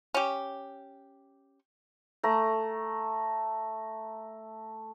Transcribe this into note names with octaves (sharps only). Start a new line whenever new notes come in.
C#4 G4
A3 A#5